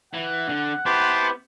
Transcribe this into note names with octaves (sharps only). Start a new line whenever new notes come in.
E3 F#5
D3
B3 E4 G4 C5 A5 C6 D6